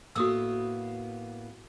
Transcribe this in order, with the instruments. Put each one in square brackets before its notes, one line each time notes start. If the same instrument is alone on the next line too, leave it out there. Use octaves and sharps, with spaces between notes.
[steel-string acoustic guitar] A2 A#3 B3 [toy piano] F#4 D#6 E6